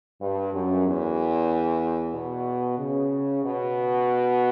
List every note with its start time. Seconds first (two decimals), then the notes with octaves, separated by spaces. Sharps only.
0.21 G2
0.53 F#2
0.85 E2
2.15 B2
2.79 C#3
3.44 B2